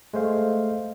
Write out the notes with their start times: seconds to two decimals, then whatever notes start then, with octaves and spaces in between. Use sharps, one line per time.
0.13 G#3 A3 C5 F5